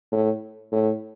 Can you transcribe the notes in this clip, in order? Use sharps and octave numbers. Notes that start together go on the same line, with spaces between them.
A2
A2